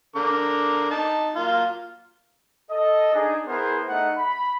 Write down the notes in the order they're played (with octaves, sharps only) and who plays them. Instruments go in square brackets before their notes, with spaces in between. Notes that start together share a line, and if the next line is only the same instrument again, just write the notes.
[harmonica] D3 A#4 D6
D#4 A5
F#3 A#3 F4
[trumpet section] A4 D#5
D4 D#4 G#4
B3 E4 G#4 A#4 C5
A3 D#4 F#5
B5